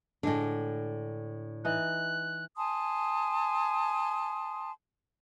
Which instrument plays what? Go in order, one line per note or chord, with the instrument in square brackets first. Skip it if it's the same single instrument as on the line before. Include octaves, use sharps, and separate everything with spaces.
[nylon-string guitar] A2 D4 [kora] D3 G#3
[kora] E3 D#4 [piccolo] F#6
[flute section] G#5 A5 C6 D#6